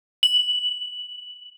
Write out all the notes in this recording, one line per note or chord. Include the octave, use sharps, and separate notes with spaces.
F#7